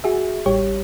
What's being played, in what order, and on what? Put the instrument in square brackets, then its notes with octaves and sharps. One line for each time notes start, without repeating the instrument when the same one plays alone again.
[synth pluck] F#4 G#4 E5
A1 G3 G4 C#5